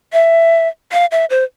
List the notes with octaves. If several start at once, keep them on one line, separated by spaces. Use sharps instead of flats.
E5
F5
E5
C5